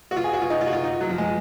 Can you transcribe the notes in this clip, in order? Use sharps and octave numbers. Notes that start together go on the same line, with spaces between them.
F#4
F4
G#4
F#4
F4
D#4
F4
F#4
F4
D#4
F#3
F3
G#3